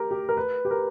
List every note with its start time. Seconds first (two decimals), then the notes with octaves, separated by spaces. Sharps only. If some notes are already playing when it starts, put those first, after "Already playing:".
Already playing: G4 A#4
0.11 G4
0.29 A#4
0.37 B4
0.65 G4
0.71 A#4